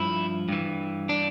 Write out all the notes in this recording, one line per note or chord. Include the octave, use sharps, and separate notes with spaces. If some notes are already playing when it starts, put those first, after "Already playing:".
Already playing: G2 F3 E4
G2 E3
D4